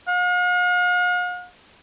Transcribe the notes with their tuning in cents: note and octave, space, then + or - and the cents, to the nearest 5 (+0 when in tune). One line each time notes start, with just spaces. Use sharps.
F5 +45